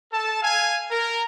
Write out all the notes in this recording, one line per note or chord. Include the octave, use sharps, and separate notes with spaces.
A4 A5
F5 G#5
A#4